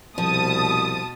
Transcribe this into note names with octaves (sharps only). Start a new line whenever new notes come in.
C2 B2 F3 A5 D#6